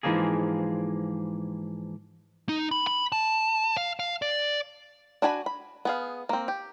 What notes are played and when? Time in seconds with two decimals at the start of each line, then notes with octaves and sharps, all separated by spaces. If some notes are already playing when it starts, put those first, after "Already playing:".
0.03 G#2 E3 F3 G#3 A#3 G#4
2.49 D#4
2.71 B5
2.87 B5
3.12 A5
3.77 F5
3.99 F5
4.22 D5
5.22 D4 F#4 G#5 A#5 B5
5.46 B5
5.85 B3 G#4 F5
6.29 A#3 C4
6.48 G4